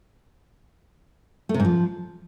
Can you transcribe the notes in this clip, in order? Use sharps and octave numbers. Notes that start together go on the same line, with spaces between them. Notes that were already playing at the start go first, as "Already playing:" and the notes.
A3
C3
G#2
F3